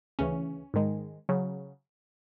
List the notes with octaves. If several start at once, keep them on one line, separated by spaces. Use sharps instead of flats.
D2 C#3 E3 C#4
G#2 D#3 G#3
C#3 F#3